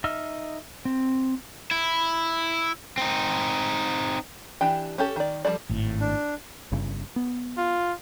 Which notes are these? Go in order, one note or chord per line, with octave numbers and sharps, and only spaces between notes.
D#4 D#5 E5 E6 F6
C4
E4
C4 D#4
E3 D4 G4 G5
C#4 G4 A4
D#3 D5
F3 G3 D#4 A4 D5
G#1 A2
D4
G1 G2 C#3
B3
F4